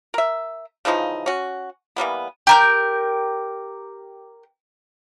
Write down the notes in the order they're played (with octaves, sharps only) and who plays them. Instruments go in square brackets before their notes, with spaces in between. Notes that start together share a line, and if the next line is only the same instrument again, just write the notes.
[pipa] A#4 E5
C#3 E3 F3 D#4
C#4 F#4
E3 G3 A#3 B3
[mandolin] G4 A#4 G6